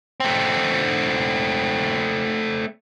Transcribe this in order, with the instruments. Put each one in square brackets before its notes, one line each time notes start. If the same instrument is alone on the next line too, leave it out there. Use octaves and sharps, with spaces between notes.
[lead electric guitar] A3 C4